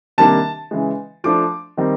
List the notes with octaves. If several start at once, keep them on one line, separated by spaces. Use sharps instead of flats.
C3 D#3 G3 A#3 D4 A5
C#3 E3 G#3
F3 A3 D4 D6
D#3 G3 C4 D#4